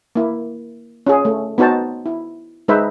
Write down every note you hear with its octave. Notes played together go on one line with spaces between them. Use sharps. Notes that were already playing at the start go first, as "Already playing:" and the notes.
A#3 E4
C#4 F4 G#4
A3
B3 D#4 F#4 C5 A5
E4
G#3 D#4 B4 C5 E5